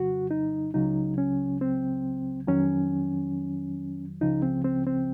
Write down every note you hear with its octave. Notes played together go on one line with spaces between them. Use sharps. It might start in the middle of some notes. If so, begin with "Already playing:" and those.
Already playing: F2 C#3 F#3 F#4
D#4
C#2 C#3 F#3 D#4
C#4
C4
F2 D#3 F#3 C#4
C#2 C#3 F3 D#4
C4
C4
C4